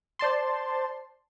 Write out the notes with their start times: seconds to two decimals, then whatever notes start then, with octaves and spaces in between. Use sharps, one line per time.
0.19 C5 D5 A5 C6